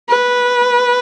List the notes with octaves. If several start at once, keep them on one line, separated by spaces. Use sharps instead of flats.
B4